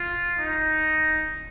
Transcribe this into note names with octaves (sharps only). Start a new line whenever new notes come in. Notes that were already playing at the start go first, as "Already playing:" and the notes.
Already playing: F4
D#4